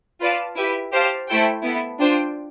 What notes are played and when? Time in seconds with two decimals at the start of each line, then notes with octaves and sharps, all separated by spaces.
0.21 F4 B4 D5 F5 A5
0.57 E4 G4 B4 E5
0.92 G4 C5 F5 A5
1.28 A3 E4 A4 C5 G5
1.64 B3 E4 A4
2.00 D4 F4 C5 G5